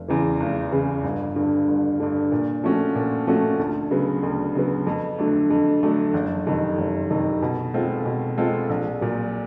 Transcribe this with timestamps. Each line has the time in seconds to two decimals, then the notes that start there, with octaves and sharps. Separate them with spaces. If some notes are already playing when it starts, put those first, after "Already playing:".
Already playing: F1
0.08 E2 C#3 E3
0.40 F1
0.72 E2 C#3 E3
1.04 G1
1.36 G2 D3
1.67 G1
2.00 G2 D3
2.32 A#2
2.64 F3 A3 C#4 F#4
2.96 A#2
3.27 F3 A3 C#4 F#4
3.59 D2
3.91 C#3 F#3 B3
4.23 D2
4.55 C#3 F#3 B3
4.87 F2
5.19 D3 F#3 A3 D4
5.50 F2
5.83 D3 F#3 A3 D4
6.14 F#1
6.47 F2 C3 D#3
6.79 F#1
7.10 F2 C3 D#3
7.42 B2
7.74 G#3 C4 F4 A4
8.06 B2
8.38 G#3 C4 F4 A4
8.70 A#1
9.01 A#2 F#3